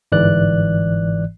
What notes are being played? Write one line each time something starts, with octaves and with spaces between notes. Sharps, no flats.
G1 G#2 E3 D5 F#6